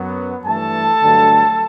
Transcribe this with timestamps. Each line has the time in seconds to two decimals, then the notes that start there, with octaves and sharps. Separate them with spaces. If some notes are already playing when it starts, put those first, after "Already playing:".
Already playing: F#2 F#3 B3
0.45 G2 E3 A3 A4 A5
1.00 G2 D3 F#3 A3